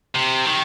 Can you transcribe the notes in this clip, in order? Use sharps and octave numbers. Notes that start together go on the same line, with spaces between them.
C3
D#3